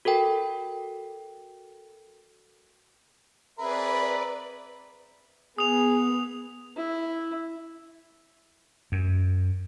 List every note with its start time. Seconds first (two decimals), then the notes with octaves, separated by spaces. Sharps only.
0.05 F#4 A4 A#4 G5
3.59 C4 G#4 A#4 B4 D5 E5 B5
5.58 B3 G#4 D#6 F7
6.77 E4
8.92 F#2